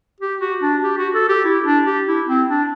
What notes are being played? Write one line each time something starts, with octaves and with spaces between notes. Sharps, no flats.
G4
F#4
D4
G4
F#4
A4
G4
E4
D4
G4
E4
C4
D4